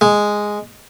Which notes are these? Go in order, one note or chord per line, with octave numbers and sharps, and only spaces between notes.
G#3